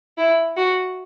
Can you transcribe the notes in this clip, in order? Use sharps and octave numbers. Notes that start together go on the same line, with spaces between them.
E4
F#4